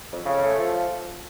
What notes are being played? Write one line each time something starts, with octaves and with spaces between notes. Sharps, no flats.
F2
C#3
A3
F3